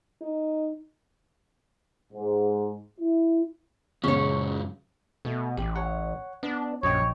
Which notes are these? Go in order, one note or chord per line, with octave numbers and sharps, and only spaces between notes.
D#4
G#2
E4
F#2 C#3 G#3 C#4 C#5
B2 A3
A1 G4
C#5 F#5
B3 D4
A#1 F#2 C#5 D#5 G5